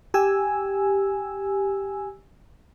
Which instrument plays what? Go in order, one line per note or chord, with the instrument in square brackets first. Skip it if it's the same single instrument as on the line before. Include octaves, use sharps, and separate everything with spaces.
[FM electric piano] G4 G#5 E6